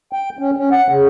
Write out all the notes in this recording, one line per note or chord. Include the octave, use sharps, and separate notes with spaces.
G5
C#4
C#4
F#5
C#3